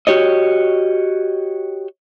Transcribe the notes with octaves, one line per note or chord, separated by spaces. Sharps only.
F#4 G4 C#5 D#5